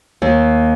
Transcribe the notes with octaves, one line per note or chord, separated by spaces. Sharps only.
D#2